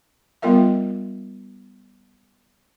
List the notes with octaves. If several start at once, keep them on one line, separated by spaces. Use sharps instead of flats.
G3 B3 F4 A#4 E5 F5